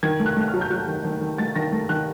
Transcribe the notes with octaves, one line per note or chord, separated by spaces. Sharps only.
D#3 G#6
A3
F#6
A3 F#6
F6
F#3
G6
F#3 F#6
D#3
D#3
D#3
A3 A6
D#3 A#6
A3
D#3 F#6